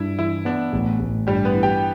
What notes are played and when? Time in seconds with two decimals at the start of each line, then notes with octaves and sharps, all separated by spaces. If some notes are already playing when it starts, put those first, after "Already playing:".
Already playing: G2 E4 E5
0.18 E3 E4
0.45 B3 D4
0.73 A1
1.00 A1
1.27 G2 G3 G4
1.45 B3 B4
1.54 E3
1.63 G4 G5